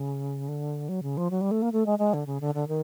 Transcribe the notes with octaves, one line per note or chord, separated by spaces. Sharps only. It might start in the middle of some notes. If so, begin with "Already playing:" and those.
Already playing: C#3
D3
F#3
C#3
F3
F#3
G3
A3
A#3
A3
G#3
G#3
D3
C#3
D3
D3
D#3